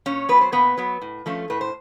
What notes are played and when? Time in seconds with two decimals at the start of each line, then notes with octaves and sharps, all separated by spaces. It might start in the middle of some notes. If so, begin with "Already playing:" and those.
0.06 A#2 C#4 C#5
0.29 F#3 B3 B4
0.41 C5
0.52 A#2 B3 B4
0.78 F#3 B3
1.02 A2
1.26 F3 A3 C#4
1.50 A2 B4
1.61 C5